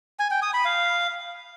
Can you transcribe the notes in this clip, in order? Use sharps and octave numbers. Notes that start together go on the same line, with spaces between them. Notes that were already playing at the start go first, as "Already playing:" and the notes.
G#5
G5
D#6
B5
F5